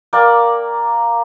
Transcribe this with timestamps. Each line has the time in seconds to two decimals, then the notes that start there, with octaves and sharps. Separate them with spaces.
0.13 A#3 D5 G5